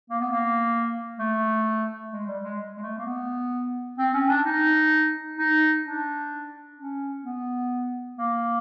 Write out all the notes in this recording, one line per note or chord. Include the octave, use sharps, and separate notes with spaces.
A#3
B3
A#3
A3
G#3
G3
G#3
G#3
A3
A#3
B3
C4
C#4
D4
D#4
D#4
D4
C#4
B3
A#3